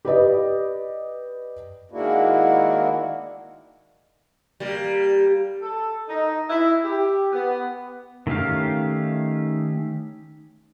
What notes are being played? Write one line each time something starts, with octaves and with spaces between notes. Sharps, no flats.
G4 B4 D5 D#5
D#3 G#3 A#3 D4 E4 F#4
G3 A#3
A4
D#4
E4
G4
B3
D#3 A3 C#4 G4 F5